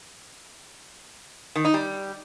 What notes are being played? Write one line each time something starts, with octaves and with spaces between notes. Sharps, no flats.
D#3
D#4
G3